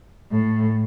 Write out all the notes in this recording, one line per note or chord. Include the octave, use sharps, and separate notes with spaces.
A2